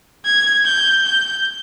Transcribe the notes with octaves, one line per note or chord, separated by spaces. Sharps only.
G#6
G6
G6